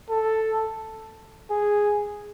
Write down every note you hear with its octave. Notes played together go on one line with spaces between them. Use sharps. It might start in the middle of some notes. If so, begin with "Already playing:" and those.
A4
G#4